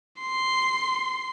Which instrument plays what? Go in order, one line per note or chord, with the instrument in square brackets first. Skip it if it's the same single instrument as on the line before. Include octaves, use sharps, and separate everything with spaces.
[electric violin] C6 C7